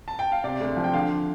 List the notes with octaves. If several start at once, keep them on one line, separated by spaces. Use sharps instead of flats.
A5
G5
F5
C3 D5
D2
F3
G5
D3 F5